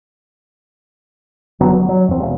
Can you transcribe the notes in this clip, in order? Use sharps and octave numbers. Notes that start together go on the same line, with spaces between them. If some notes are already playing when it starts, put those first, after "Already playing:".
F1 D3 F#3 B3
F#3
F#3
E2 C4
E1